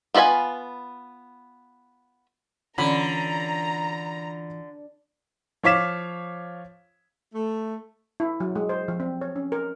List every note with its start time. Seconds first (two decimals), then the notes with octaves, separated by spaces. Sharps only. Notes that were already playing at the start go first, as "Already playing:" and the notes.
0.14 B3 F4 B4 D#5 G#5
2.78 D3 E3 C#4 F4 A#5 B5
5.63 F3 C#5 F5 D6 B6 E7
7.33 A3
8.20 E4
8.40 F#3
8.56 G#3
8.69 C5
8.88 F3
9.00 C4
9.21 C#5
9.36 C#4
9.52 A#4